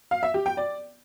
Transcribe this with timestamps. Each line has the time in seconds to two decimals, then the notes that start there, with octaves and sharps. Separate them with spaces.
0.11 F5
0.23 E5
0.34 G4
0.46 G5
0.57 D5